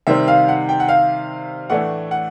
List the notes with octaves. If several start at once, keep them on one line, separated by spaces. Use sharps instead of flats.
C3 D#3 G3 C4 E5
F5
F#5
G5
F#5
F5
A2 E3 A3 D4 F#5
F#5